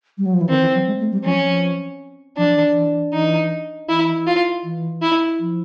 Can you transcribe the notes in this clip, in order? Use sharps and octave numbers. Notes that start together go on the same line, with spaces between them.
G3
F#3
F3
E3
D#3 C4
E3
F#3
G#3
A3
G3
F3 C#4
F3
F3 D4
E3
E3
E3 D#4
E3 E4
F4
E3
E4
F3